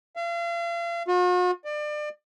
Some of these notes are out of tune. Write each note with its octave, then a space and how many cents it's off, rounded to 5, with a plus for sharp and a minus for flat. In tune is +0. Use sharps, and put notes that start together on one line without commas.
F5 -40
F#4 -45
D5 +30